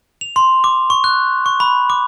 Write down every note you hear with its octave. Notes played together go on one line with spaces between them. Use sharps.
F7
C6
D6
C#6
F#6
C#6
B5
D6